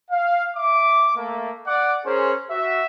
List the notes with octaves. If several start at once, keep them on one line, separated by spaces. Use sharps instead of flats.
F5
E5 D6
A3 A#3
D5 F#5 D6
C#4 G#4 A#4 C5
F#4 E5